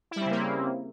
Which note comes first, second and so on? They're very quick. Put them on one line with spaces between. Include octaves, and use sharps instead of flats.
E4 G3 C4 C#3 A#3